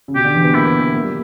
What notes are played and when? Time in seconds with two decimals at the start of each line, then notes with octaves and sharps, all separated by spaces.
0.08 C#3
0.15 B2 G4
0.25 D3
0.35 E3
0.44 B3
0.54 A#3 E4
0.67 B3
0.80 B3
0.94 A#3
1.04 G3